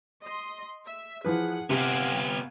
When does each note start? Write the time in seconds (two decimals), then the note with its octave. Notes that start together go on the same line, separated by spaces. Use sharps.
0.24 D#5 C6
0.86 E5
1.25 E3 F3 G#4 B4 F#5
1.70 C3 B3 G4 F5 F#5 G#5